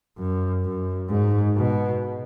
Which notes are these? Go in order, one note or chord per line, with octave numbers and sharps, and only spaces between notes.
F#2
F#2
G#2
B2